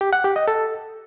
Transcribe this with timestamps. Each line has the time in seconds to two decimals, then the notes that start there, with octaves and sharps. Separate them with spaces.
0.01 G4
0.13 F#5
0.24 G4
0.36 D#5
0.48 A4